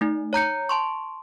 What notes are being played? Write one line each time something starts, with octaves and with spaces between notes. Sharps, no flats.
A3 D#4
C#5 A#5 G6 C#7
A5 C6 C#6